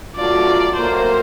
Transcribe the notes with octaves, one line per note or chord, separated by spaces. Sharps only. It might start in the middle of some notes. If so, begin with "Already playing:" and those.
B2 F#3 A3 D4 F4 D5
A2 F#3 A#3 C5